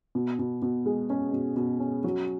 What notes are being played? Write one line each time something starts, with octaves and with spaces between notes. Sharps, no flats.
B2
B2
B2
G#3
C#4
B2
B2
C#4
F#3